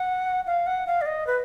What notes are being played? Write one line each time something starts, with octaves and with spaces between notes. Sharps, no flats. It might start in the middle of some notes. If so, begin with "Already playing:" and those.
Already playing: F#5
F5
F#5
F5
D5
D#5
B4